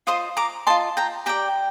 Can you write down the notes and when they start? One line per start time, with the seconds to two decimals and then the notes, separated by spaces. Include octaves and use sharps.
0.07 F4 C5 D#5 C6 D#6
0.37 A#5 D6
0.67 F4 C5 D#5 A5 C6
0.97 G5 A#5
1.26 G4 D5 G5 A#5